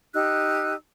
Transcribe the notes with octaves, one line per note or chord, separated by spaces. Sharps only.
D#4 G4 E6 F#6